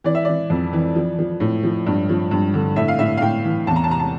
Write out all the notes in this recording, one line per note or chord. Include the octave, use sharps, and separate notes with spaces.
E3 D5
E5
E3 D5
F2
E3
F3
F3
A2
F3
G2
F3
G2
D3
A2 E5
F5
A2 E5
F5
A2 G5
E3
E2 A5
A#5
A5
C3 A#5
A5